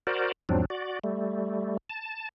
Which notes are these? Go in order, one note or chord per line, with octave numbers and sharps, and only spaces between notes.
F#4 A#4 C5 D5
E2 G#2 F3 F#3 C4 D4
F#4 D5
G3 A3
A5